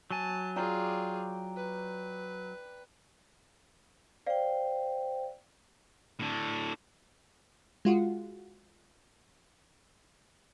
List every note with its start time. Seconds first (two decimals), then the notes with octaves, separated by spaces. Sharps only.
0.11 F#3 G#5 A5
0.56 F4 G#4 D5 G5 A#5
1.56 B4
4.27 C5 D5 F5 G5
6.19 A2 D3
7.85 G#3 F4 F#4